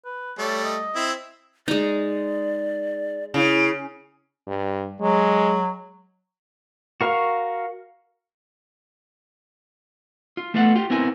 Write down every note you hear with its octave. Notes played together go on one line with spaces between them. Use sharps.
B4
G3 A3 C#5
D#5
C4 E4
G#3 D#4 D5
C#3 E4
G2
F#3 G#3
F#4 A#4 F5 C#6
F4
A3 B3 F4 A4 F#5
F4 G4 G5
B3 C4 E4 A#4 G#5